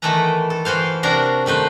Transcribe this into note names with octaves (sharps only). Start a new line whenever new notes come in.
D#3 E3 A3 A4 B4 A#5
A4
E3 F#4 C5 F5
C3 D4 F#4 A#4 A#5
D#3 A3 B4 C5